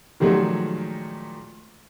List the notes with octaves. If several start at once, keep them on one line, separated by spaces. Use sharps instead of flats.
A#2 D#3 F3 F#3 G#3 A3